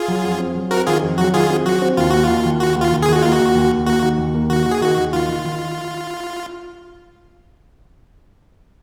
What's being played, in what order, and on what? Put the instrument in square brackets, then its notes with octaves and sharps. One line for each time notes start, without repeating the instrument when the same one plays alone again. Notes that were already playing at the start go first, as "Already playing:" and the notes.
Already playing: [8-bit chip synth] F4 G#4
[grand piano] F#3
F2
C4
F#3
[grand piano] C4 [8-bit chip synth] F#4 A#4
[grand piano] D#3 [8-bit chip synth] F4 G#4
[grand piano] F2
[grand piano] F#3 [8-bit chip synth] F#4
[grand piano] D#3 [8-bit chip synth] F4 G#4
[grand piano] C4
[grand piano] F#3 [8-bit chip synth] F#4
[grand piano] C4
[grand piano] D#2 [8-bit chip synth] F4
[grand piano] A#3 [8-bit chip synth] F#4
[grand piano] D#2 [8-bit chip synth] F4
[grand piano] D#2
[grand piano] A#3 [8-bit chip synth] F#4
[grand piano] D#2
[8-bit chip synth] F4
[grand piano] D#2
[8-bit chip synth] G#4
[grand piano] D#3 [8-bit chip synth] F#4
[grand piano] A#3 [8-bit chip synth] F4
[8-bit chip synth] F#4
[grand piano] D#2
D#2
D#2
[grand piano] A#3 [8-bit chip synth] F#4
[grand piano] D#3
D#2
A#3
[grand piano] D#3 [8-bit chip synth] F#4
[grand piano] D#3
[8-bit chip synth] G#4
[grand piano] D#3 [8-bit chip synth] F#4
[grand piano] D#2
[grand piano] D#3 [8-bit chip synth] F4
[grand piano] D#3
D#3